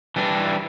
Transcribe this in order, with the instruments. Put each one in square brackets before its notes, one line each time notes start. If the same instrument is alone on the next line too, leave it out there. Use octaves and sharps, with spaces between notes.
[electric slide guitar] E3 G3 D4